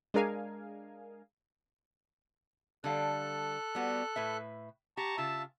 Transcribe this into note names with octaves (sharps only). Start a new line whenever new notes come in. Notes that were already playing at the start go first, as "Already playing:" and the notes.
G#3 D4 G#4 A#4 F5 G#5
D3 G3 A4 F5 F#6
G3 B3 F#4
A2 B4 E5
G4 A5 A#5 C#6
C#3 F4 E5 A5